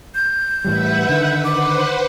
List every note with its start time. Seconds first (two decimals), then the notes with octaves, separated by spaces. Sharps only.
0.15 G6
0.65 A2 E3 G3 B4 E5 F#5
1.09 D3 D#3
1.44 B4 C5 F#5 D6